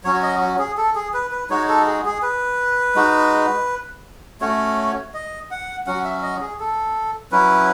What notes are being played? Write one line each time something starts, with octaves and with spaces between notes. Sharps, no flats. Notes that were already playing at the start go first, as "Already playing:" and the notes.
F#3 C#4 F#4 C#5
D#5
F#4
G#4
A4
G#4
B4
B4
G#3 D#4 F#4 C#5
A4
G#4
G#4
B4
G#3 D#4 F#4
A3 C#4 F#4 C#5
D#5
F#5
F#3 C#4 F#4 F#5
E5
D#5
G#4
A4
F#3 C#4 E4 B4